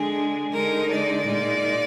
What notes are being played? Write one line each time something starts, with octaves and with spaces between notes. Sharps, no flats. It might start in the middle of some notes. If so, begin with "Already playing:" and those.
Already playing: D3 G#3 D4 G#4
D3 G#3 D#4 A#4
D5
A#2 G#3 D#4